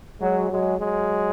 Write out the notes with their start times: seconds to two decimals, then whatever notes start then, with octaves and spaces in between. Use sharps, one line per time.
0.21 F#3 G#3
0.50 F#3 G#3
0.79 F#3 G#3